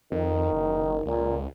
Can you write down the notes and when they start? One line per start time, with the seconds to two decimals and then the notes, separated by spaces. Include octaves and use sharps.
0.12 F2 D#3
0.53 F#1
1.06 C#2 A#2